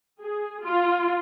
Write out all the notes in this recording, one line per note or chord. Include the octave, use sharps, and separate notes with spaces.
G#4
F4